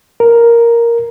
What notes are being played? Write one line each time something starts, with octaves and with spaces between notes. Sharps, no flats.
A#4